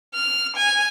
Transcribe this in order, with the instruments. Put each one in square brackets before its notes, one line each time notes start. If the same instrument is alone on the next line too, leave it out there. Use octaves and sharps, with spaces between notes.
[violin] F6
G#5